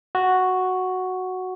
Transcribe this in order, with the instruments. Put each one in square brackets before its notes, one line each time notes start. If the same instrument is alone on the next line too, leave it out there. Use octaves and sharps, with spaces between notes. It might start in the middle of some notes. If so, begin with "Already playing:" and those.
[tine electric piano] F#4